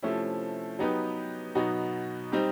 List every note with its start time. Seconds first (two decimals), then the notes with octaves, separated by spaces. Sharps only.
0.02 C3 F3 A3 C#4 E4
0.79 F#3 B3 D#4 G4 B4
1.55 B2 F#3 B3 D#4 F#4
2.32 G3 C4 D#4 G4